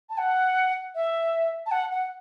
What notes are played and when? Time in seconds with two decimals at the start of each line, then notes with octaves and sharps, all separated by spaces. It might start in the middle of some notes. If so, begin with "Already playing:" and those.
0.10 A5
0.18 F#5
0.95 E5
1.66 A5
1.71 F#5
1.91 F#5